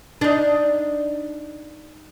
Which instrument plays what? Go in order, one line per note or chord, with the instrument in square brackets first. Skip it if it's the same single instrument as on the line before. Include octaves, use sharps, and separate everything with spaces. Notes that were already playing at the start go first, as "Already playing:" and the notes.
[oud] D4 D#4